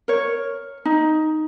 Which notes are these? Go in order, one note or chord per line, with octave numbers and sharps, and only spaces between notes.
A#4 C#5
D#4